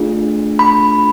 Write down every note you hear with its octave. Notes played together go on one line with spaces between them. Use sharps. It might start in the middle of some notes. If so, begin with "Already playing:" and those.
Already playing: A3 D4 F4 G#4
B5